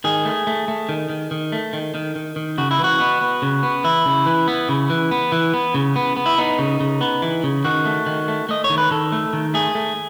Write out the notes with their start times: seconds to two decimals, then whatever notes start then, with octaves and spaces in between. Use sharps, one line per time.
0.04 D#3 G#4
0.25 A3
0.47 A3
0.68 A3
0.89 D#3
1.10 D#3
1.31 D#3
1.52 A3
1.73 D#3
1.95 D#3
2.16 D#3
2.36 D#3
2.58 C#3 F#4
2.71 E4
2.79 E3
2.84 F#4
3.00 B3
3.21 B3
3.42 C#3
3.63 B3
3.84 E3 E4
4.06 C#3
4.26 E3
4.48 B3
4.69 C#3
4.90 E3
5.11 B3
5.32 E3
5.54 B3
5.74 C#3
5.96 B3
6.17 B3
6.26 E4
6.38 B3 D#4
6.59 C#3
6.80 C#3
7.01 B3
7.22 E3
7.44 C#3
7.65 D#3 F#4
7.85 A3
8.06 D#3
8.28 A3
8.49 A3 D#5
8.64 C#5
8.70 D#3
8.78 B4
8.91 D#3 A4
9.12 A3
9.33 D#3
9.54 A3 G#4
9.75 A3